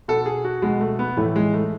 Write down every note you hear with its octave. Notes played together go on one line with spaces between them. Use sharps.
B2 A4
G#4
F#4
B2 G#3
A3
B3
A2 E3 A3
G#3
A3